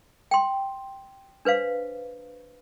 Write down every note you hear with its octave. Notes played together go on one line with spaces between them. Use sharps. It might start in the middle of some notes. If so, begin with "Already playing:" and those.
G5 C6
D4 B4 C5 F5